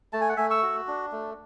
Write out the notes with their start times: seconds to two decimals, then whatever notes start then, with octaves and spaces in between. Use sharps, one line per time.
0.13 A3 A5
0.21 G#5
0.29 F#5
0.37 A3 E5 G#5
0.50 C#6 E6
0.63 F#4
0.88 D4
1.12 A3